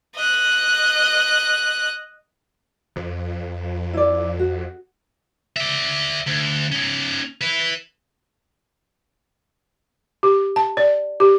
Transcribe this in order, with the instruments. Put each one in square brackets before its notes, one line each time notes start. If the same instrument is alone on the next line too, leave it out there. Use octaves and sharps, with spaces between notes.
[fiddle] D#5 F#6
[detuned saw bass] F2
[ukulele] E4 D5
F#4
[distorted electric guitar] D5 E5
D2
C#4 D#4
E4 B4
[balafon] G4
A5
D5
G4